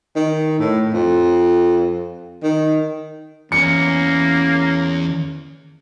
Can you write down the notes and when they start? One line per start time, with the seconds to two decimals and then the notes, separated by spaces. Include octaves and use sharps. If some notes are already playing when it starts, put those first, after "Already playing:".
0.16 D#3
0.59 A2
0.93 F2
2.44 D#3
3.52 E2 A#3 C#4 C#7